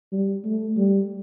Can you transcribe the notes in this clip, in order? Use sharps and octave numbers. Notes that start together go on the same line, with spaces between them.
G3
A3
G3